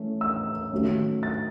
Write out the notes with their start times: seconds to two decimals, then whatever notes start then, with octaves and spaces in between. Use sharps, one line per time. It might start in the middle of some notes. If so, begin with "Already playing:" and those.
Already playing: E3 A3 C#4
0.21 E6
0.71 D#3 F#3 A3 C#4
1.23 A6